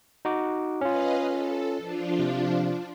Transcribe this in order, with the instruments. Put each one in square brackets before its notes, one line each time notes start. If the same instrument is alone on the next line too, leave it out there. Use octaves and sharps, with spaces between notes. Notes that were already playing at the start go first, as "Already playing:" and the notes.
[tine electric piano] D#4 F#4 D6
[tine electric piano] C#4 F4 [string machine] B4 D#5 F5
[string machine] A4
F3 D4 F4
[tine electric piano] C3